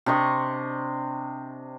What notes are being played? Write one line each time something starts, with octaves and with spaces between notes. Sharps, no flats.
C3 D4 D#5 C#6